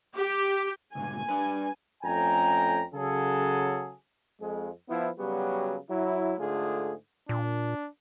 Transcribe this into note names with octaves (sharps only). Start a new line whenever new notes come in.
G4
C#2 G2 A#2 G#5
G3 D4 B4
F2 A3 C#4 G5 G#5 A#5
C#3 F#3 G#4 A4
F2 G#3
F3 B3 E4
C#3 F#3 G3 B3 F#4 G4
F#3 E4
G#2 D3 A3 F4 G#4
A#2 D4